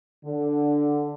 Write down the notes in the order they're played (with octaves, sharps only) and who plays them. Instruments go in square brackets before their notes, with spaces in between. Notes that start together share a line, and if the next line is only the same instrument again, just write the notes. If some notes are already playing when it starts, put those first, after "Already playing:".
[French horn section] D3